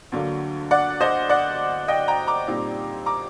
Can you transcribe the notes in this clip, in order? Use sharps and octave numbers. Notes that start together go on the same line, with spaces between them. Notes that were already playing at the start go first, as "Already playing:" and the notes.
D2 D3 F#3 A#3
D5 F#5
C5 D#5
D5 F#5
D#5 G5
G5 A#5
A#5 D6
A#2 G3 C4 D#4
A#5 D6